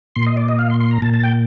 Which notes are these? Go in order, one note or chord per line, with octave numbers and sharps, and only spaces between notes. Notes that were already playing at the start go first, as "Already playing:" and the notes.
A#2 C6
D#5
D5
D#5
F5
C6
C6
A#5
A#2 A5
A5
G5